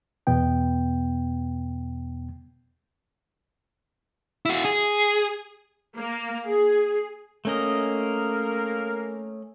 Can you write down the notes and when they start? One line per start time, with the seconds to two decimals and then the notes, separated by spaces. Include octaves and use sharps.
0.27 E2 B2 B3 G5
4.45 E4 F#4
4.65 G#4
5.96 A#3
6.46 G#4
7.45 A3 A#3 C#4 A#4 D#5